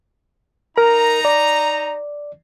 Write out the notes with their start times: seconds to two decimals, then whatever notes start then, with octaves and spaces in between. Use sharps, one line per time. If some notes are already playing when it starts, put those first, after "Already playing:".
0.78 D#4 A#4 A#5
1.25 D5